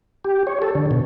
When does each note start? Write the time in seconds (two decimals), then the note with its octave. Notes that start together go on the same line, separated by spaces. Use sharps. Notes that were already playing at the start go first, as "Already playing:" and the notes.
0.24 G4
0.47 C#5
0.62 A4
0.75 D3
0.91 B2